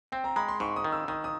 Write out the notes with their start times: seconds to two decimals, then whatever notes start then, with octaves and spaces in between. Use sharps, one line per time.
0.12 C4 G5
0.24 A#5
0.36 G#3 B5
0.48 C6
0.60 G#2 C#6
0.76 D#6
0.84 D#3
0.92 E6
1.08 D#3 D#6
1.24 D#6